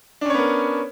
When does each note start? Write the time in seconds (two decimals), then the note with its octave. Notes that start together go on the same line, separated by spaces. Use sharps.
0.21 D4
0.26 C#4
0.30 C#5
0.34 B3
0.38 A#4